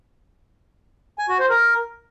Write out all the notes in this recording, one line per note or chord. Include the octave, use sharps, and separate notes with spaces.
G#5
F#4
C5
A#4